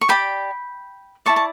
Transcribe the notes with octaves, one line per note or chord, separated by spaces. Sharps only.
C#6
G4 D5 G5 B5
E4 A4 D5 A5 C#6
A5